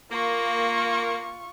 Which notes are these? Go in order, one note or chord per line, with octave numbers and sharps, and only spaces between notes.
A#3 F4 C#6